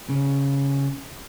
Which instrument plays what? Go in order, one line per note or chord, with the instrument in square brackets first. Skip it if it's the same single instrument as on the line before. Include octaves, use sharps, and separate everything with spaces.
[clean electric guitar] C#3